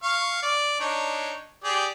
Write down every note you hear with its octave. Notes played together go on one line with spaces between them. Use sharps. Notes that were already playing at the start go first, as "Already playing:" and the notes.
F5 C#6
D5
D4 D#4 C#5
G4 G#4 D5